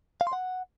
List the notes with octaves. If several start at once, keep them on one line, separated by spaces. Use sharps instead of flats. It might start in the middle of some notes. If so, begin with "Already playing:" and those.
F5
C6
F#5